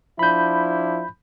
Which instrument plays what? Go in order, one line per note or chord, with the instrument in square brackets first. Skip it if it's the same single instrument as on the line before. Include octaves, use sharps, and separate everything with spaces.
[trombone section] F3 D4 E4 [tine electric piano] B5 G6